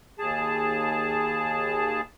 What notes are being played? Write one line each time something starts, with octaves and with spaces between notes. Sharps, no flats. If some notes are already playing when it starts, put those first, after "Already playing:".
D#2 G#4 A5